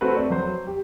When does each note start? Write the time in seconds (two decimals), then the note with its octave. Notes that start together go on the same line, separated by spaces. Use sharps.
0.01 A3 C4 F#4 B4
0.16 D5
0.30 F#3 C5
0.67 G4